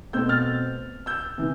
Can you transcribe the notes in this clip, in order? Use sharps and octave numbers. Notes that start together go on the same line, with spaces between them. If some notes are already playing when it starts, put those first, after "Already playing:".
B2 A3 C4 E6 G6
F6 A6
E6 G6
C3 E3